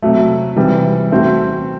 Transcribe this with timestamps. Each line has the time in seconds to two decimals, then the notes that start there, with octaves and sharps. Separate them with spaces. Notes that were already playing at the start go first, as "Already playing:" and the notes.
0.02 C3 F#3 A3
0.56 C3 E3 G3
1.11 A3 C4 F#4